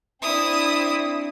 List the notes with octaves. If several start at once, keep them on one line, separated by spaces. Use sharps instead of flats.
C4 D4 E4 D#6